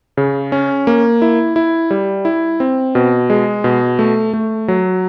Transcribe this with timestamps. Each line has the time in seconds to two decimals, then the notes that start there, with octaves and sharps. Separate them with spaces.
0.17 C#3
0.52 C#4
0.87 A#3
1.22 E4
1.56 E4
1.91 G3
2.25 E4
2.60 C4
2.95 B2
3.30 G#3
3.64 B2
3.99 A3
4.33 A3
4.68 F#3